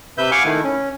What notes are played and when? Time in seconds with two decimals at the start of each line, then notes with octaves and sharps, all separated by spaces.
0.18 C3 B4 E5 G6
0.31 F5 F#5 G#5 C#6 D6 F6
0.45 D#3 A3 E4
0.64 C#4